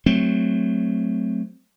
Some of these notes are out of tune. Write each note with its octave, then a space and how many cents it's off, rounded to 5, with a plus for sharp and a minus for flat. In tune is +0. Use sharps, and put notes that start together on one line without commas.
F#3 +0 A3 +0 C4 +0